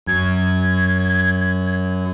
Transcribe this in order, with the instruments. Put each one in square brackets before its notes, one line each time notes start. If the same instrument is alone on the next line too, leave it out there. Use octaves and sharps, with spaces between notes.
[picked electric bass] F#2 [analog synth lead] G#6